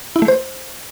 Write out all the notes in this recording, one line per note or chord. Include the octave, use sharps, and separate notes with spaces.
E4
A3
C5